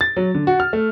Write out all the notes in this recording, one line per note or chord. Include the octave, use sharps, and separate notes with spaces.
A6
F#3
D3
F#4
F6
A3